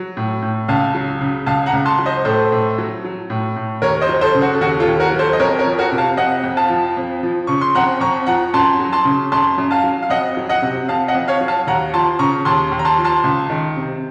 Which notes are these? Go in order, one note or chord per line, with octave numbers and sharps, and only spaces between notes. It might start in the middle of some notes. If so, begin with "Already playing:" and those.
Already playing: F#3
A2
A2
C#2 F5 A5
F#3
C#3
C#2 F5 A5
F#5 A#5
C#2
A5 C6
F#3
C5 D#5
A2 A4 C5
A2
F#3
F#3
A2
A2
D#2 A#4 C#5
C5 D#5
F#3
A4 C5
C#3
F#4
A4
D#2 F#4
F4 A4
D#2
F#4 A#4
F#3
A4 C5
D#5
F2 A#4 C#5
A#4 C#5
F3
F#4 A#4
C3
F5 A5
F2 D#5 F#5
F2
F5 A5
F3
F2
F3
C#3 C#6
C6
F2 F#5 A#5
F2 A#5 C#6
F3 F#5 A#5
F#2 A5 C6
F#3
A5 C6
C#3
F#2 A5 C6
F#2
F5 A5
F#3
F5
F2 D#5 F#5
F#3
D#5 F#5
C3
F2 F5 A5
D#5 F#5
F2
C#5 F5
F#3
F5 A5
D#2 F#5 A#5
F3 A5 C6
C#3 A#5 C#6
D#2 A5 C6
D#2
A#5
A5 C6
F3
A5 C6
C#2
D#3
C3